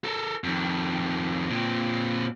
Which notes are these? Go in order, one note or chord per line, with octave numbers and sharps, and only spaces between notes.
A4 A#4
F2 D#3
A#2 C4